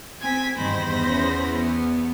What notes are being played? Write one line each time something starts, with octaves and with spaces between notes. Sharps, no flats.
C4 G#5 G#6 B6
E2 G2 D#3 C5 B5 A#6
C#4
B3